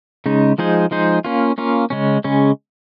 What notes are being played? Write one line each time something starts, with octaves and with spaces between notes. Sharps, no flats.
C#3 G#3 D#4
F3 G#3 D#4 G#4 C5
F3 G#3 D#4 G#4 C5
A#3 C#4 F4
A#3 C#4 F4
C#3 G#3 C#4
C#3 G#3 C#4